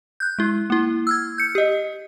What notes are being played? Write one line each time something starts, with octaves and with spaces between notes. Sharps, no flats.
F#6 G6
G#3 E4
A#3 E4
E6 F6 G#6
G6 C#7
G4 D#5